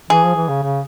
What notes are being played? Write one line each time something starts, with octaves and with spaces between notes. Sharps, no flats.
E3 G#4
F3
E3
C#3
C#3